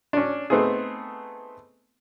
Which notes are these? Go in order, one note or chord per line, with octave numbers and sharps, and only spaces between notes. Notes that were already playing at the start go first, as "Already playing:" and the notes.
C#4 D4
A3 B3 C4 D#4 G#4